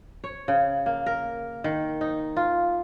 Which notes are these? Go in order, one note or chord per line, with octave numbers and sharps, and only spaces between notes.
C#5
C#3
A#3
A#4
D#3
D#4
F4